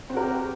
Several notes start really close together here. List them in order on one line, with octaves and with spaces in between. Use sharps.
C4 F#4 A#4 G4